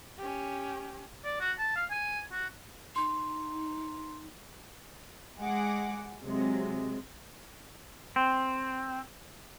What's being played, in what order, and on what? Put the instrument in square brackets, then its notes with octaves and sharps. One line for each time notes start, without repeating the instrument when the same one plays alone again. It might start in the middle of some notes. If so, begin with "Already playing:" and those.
[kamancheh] C#4 G4
[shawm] D5
F#4
A5
F5
G#5
F#4
[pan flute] D#4 [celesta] C6
[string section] G#3 G#4 F#5 D6
C3 F#3 G#3
[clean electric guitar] C4